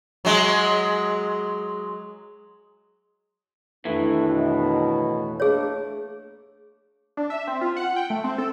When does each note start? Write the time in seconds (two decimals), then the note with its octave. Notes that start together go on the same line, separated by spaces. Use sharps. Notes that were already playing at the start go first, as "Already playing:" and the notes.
0.25 F#3 G#3
3.85 F2 A2 D#3 E3 A3 D4
4.27 B2
5.40 A3 A#3 D4 G#4 C#5
7.17 D4
7.30 E5
7.47 C4
7.61 F4
7.77 F#5
7.96 G5
8.10 A3
8.24 C4
8.38 A4